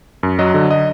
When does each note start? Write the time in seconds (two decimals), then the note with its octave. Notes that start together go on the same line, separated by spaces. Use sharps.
0.23 F#2
0.39 F#3 D#5
0.54 D3 D#5
0.71 D#5